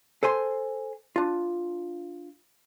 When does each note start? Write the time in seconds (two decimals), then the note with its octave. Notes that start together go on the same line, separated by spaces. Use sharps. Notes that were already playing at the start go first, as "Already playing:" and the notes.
0.23 A4 C5 G#5 C6
1.16 D4 F4